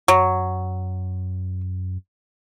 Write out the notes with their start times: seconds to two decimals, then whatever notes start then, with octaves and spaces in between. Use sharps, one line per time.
0.08 F#2 F#3